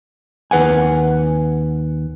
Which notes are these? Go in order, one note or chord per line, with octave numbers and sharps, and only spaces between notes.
D#2 B4 F#5 G#5